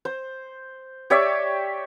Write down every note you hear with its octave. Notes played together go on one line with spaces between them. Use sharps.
C5
G4 C#5 D5 E5